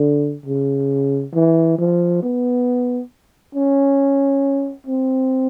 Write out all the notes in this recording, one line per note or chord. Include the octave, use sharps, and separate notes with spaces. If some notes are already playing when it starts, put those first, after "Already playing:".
Already playing: D3
C#3
E3
F3
B3
C#4
C4